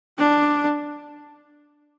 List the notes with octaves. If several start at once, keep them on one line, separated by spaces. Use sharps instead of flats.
D4